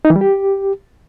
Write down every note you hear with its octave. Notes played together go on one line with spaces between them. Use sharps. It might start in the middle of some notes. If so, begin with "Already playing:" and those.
D#4
E3
G3
G4